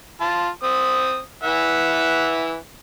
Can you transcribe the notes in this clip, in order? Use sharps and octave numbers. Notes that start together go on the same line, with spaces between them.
F4 A5
C4 D#6
E3 E5 F#5